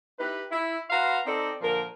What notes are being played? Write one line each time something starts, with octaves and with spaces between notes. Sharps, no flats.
D#4 E4 G4 B4
E4
F#4 B4 F5 A#5 C6
C4 D#4 A4 D5 D#5
A#2 D3 F3 A#4